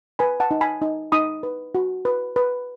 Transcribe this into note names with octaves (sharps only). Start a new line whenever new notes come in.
B4 G#5 B5
F#5 A5
D#4
G#5 B5
D#4
D#4 B5 D#6
B4
F#4
B4
B4